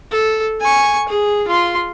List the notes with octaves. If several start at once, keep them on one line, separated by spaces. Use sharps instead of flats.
A4
G#5 C#6
G#4
F4 C6